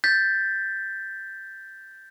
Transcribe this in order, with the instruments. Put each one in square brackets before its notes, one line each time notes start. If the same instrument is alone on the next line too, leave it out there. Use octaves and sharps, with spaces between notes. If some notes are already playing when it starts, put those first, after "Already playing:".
[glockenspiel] G6 A6 B6